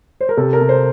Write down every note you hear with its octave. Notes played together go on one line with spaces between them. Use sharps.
C5
A#4
C3 A4
A#4
C3
C5